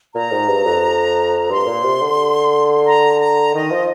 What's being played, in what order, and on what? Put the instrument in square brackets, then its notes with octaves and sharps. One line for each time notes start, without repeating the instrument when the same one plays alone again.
[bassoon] A#2 [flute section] A#5
[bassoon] G#2
G2
F2
[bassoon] G2 [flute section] C6
[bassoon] A#2
C3
D3
[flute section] A#5
A#5
[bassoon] D#3 [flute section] D#5
[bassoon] F3